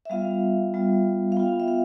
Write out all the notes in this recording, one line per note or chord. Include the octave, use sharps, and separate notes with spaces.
E5
G3 B3 F4 F5
G3 B3 F4
F5
B3 F4 G5
E5
F5